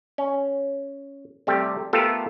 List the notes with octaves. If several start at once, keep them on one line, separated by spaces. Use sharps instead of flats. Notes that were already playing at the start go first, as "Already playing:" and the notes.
C#4
C3 G3 A3 G4
A3 B3 F4 G4 A4 A#4